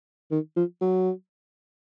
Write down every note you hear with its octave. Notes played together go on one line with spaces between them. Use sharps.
D#3
F3
F#3